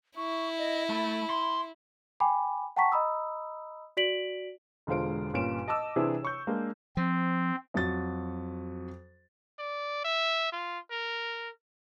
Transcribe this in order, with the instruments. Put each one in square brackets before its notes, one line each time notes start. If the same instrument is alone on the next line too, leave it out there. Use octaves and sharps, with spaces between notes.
[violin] E4 [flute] C#6
[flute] D#5
[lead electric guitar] A3 [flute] B5
[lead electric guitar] C6
[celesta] G5 G#5 B5 D6
F#5 G5 A5 A#5 C#6 B6
D#5 A#5 B5 D#6 E6
F#4 D5 B6 D7 F#7
[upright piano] E1 D3 G#3 F4 C5 D7
G1 A#2 C#4 F4 D7 E7
D#5 A5 D6 E6
C3 E3 D4 E4 G#4 C5
C#5 C#6 G6
G#3 A#3 D4
[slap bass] F3 [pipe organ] C4
[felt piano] F2 F#3 F#4 A6
[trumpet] D5
E5
F4
A#4